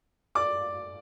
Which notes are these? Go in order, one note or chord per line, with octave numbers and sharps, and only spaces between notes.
D5 D6